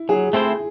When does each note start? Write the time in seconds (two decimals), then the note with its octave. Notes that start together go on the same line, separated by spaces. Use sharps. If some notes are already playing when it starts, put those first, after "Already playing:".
Already playing: E4
0.09 F#3 G#4
0.33 A3 C4 E4 C5